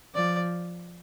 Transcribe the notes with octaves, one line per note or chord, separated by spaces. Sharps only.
F3 D5